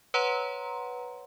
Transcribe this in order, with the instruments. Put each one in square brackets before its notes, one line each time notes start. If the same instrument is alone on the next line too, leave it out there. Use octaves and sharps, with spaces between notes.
[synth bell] B4 C#5 F#5 A#5 C6